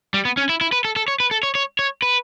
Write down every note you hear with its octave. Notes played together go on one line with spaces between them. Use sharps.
G3
B3
C#4
E4
E4
B4
A4
A4
C#5
B4
A4
C#5
C#5
C#5
B4